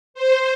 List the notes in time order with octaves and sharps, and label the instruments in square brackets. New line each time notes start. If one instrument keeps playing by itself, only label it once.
[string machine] C5